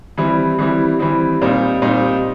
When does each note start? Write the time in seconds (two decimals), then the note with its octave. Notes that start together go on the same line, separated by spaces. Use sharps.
0.18 E3 G3 C4 E4
0.59 E3 G3 C4 E4
0.99 E3 G3 C4 E4
1.42 A#2 G3 C4 D#4
1.82 A#2 G3 C4 D#4